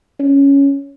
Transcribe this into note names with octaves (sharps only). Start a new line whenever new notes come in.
C#4